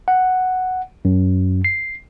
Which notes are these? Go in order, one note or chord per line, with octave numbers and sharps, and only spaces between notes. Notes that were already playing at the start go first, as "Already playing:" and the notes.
F#5
F#2
C7